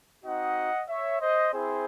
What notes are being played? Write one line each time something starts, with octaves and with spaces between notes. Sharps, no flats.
C4 D#4 F#4 D#5 F#5
C#5 E5
C5 D#5
C4 E4 G#4 C5